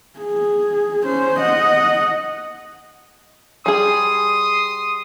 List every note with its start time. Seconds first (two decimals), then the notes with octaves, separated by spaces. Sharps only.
0.20 G#4
1.05 C#4 C5
1.40 D#5 F#5
3.66 G3 G#4 C6 D#6